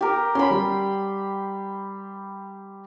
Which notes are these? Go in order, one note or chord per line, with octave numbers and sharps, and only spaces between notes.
G4 A#4
C#4 B5 C6
G3